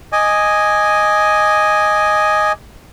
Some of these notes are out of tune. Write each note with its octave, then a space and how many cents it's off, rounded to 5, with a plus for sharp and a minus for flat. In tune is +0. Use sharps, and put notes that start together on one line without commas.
D#5 +0 G#5 +0 D6 +0